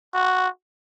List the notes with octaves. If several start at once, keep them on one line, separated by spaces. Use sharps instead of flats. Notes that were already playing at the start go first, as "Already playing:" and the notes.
F#4